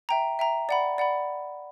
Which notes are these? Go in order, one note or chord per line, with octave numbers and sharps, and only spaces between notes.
E5 G5 A#5
E5 G5 A#5
D5 F#5 B5
D5 F#5 B5